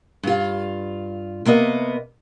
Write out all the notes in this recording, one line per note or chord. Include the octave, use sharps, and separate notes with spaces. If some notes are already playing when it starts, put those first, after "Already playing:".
G2 F4
C3 A#3 B3 D#5